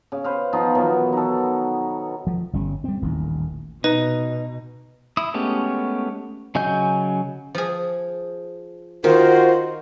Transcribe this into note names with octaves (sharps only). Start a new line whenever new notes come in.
C#3
B4 C5 F5
F3 B3 D#4 F4
B2 D#3 E3 F#3
D#4 A4
F3
G1 G3 C#4
G3 C4
D#1 A1 D#3
B2 D#4 B4
E4 D#6
G#3 A3 B3 C#4 G4
C#3 F#3 D#5 G#5 G6
F3 G#4
D#3 F4 F#4 A#4 C5